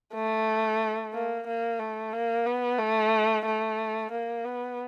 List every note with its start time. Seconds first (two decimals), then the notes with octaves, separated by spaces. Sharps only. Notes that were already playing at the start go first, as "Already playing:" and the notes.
0.14 A3
1.13 A#3
1.47 A#3
1.79 A3
2.13 A#3
2.46 B3
2.79 A3
3.46 A3
4.11 A#3
4.45 B3